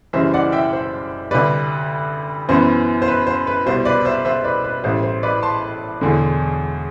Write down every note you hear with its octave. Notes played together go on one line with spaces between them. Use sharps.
F#1 F#2 E3 G3 C5 E5
D5 F#5
E5 G5
C5
D2 C3 G3 B4 D5
F#2 E3 B3 C5
C5
B4
C5
B4
C2 B2 G3 C5
B4 D5
C5 E5
C5 E5
B4 D5
B4
A1 A2 G3 C5
C5
B4 D5
A5 C6
E1 E2 D3